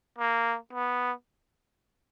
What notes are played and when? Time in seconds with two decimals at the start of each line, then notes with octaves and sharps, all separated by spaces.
0.18 A#3
0.73 B3